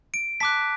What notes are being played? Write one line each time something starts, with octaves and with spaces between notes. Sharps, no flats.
D7
A5 D6 F#6 B6